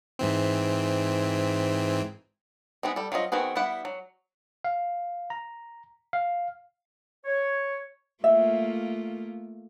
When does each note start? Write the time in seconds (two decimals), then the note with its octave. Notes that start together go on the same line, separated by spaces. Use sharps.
0.19 G#2 E3 C4
2.83 G#3 B3 C4 D#4
2.96 G3 A4
3.12 F#3 C4 F4 D#5
3.32 D#3 B3 C4 F#4 G#4
3.56 G3 B3 E4 F#5
3.85 F#3
4.64 F5
5.30 A#5
6.13 F5
7.25 C#5
8.24 A3 A#3 F4 E5